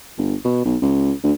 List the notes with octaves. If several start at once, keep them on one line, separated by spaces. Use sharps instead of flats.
G1
B2
B1
C#2
D2